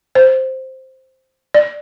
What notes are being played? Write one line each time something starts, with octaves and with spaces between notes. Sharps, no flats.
C5
D5